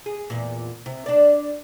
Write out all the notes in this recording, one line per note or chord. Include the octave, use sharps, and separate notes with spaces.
G#4
E2 A#2
C3
D4 D5